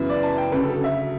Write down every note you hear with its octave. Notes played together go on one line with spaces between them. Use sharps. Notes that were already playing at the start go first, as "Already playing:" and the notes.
Already playing: F#2 C#3 E3 B3 E4
D5
A5
G5
D2 C#3 F#3 B4
A4
A4
E5